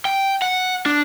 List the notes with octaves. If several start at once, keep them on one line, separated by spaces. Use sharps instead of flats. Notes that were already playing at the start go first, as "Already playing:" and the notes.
G5
F#5
D4